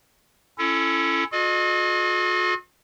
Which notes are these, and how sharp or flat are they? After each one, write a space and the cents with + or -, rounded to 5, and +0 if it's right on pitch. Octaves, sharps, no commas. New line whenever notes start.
C#4 +0 E4 +30 A4 +0
F4 +45 A4 -45 D#5 -30